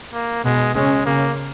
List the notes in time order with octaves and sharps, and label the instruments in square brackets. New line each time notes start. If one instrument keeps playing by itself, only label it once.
[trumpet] A#3
[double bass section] B2 B3 [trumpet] G#3
[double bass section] C#3 C#4 [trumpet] G#3
[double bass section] C#3 C#4 [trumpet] A#3